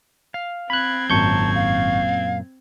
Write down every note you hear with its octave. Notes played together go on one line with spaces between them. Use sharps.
F5
C4 B5 F#6 G#6
G#1 F#2 A#2 A5 C#6 G6
F5